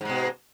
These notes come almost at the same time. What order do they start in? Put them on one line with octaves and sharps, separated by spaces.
G#2 G#3 B2